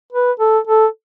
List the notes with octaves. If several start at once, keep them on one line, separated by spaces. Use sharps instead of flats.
B4
A4
A4